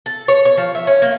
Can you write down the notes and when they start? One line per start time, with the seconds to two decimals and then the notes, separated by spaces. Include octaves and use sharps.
0.06 A4
0.28 C#5
0.45 C#5
0.57 F3
0.75 E5
0.87 C#4
1.02 A#3